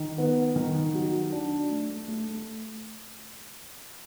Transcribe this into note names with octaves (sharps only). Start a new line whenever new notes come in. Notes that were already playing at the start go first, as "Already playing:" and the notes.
Already playing: D#3
B3
D#3
F#3
D4
A3
A3